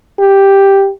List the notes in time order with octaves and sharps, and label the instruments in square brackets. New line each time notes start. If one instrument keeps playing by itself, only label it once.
[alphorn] G4